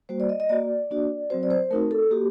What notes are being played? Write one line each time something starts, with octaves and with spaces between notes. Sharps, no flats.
G3 A#3 F#4 C5
D5
D#5
D#5
A#3 F#4 D5
A#3 D4 F#4
F#3 C4 F#4 C5
D5
C5
A3 C4 D#4 F#4 A#4
A4
A#3 F#4 G4